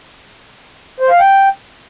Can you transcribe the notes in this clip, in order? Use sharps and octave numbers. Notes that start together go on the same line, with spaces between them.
C5
F5
G5